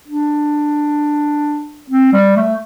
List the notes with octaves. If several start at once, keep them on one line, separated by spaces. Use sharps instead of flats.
D4
C4
G3
A3